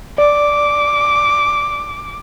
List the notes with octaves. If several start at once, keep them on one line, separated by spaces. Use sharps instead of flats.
D5 D6